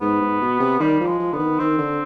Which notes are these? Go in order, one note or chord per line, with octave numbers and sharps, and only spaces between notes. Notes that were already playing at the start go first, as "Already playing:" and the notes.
G#2 B3
G#2
B2
C3
D#3 G3
F3
G#3
F3
D3 B3
D#3
D#3 C4
D3